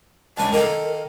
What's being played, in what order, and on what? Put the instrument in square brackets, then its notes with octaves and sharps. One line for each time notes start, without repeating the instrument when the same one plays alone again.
[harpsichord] C#2 G#5 [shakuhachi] A5
[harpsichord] D#3 A4 [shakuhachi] A#4